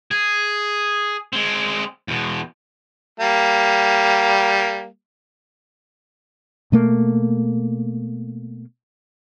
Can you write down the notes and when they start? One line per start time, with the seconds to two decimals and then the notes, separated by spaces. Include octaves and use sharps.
0.11 G#4
1.33 G#3 C4
2.08 E2 B2
3.20 G3 A#3
6.72 B2 A3 A#3